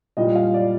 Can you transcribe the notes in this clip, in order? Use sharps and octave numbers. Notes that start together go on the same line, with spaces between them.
A#2 G3 D#5
F5
D5